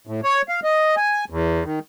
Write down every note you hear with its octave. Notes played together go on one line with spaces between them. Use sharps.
A2
C#5
F5
D#5
G#5
E2
D#3